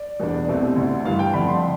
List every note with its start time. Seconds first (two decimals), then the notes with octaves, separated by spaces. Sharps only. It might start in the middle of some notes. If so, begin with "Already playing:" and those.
Already playing: D5
0.20 E2 B2 B3 D4
0.48 C2 B2 A3 C4
0.76 D2 D3 A3
1.05 G2 E3 G3 F5
1.19 G5
1.34 F2 D3 A3 D4 B5
1.48 C6